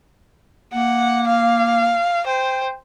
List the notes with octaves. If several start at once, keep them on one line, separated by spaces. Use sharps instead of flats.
A#3 F#5
F5
C5 G5